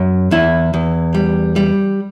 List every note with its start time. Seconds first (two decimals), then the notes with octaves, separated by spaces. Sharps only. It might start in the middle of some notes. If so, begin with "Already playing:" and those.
Already playing: F#2
0.31 E2 E4
0.74 E2
1.15 G3
1.56 G3